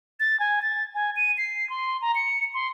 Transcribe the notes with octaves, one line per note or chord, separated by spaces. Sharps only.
A6
G#5
A6
G#5
D#7
C7
C6
A#5
C#7
C6